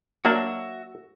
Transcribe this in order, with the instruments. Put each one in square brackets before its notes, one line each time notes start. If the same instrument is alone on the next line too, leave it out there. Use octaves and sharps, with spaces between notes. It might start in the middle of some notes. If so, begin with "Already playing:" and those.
[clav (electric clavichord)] F#3 A#3 D4 [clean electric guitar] F#4 E5